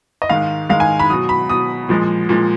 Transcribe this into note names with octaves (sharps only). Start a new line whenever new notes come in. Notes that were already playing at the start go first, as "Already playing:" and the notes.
D#5
G#2 D#3 G#3 F5
G#2 D#3 G#3 F5
G#5
B5
B2 F#3 D#6
B5
B2 F#3 D#6
A#2 F3 G#3
A#2 F3 G#3